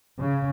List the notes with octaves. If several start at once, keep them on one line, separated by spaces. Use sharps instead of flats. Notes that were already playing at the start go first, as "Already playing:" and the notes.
C#3